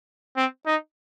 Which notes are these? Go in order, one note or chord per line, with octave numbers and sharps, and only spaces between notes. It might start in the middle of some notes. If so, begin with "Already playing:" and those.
C4
D#4